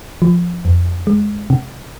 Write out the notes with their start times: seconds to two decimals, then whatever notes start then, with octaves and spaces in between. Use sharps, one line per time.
0.22 F3
0.65 F2
1.07 G#3
1.50 C3